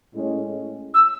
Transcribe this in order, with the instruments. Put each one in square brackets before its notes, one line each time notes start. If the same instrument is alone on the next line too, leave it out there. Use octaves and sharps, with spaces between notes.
[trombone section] A2 G#3 C#4
[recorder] E6